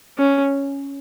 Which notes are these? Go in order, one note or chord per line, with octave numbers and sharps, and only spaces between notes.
C#4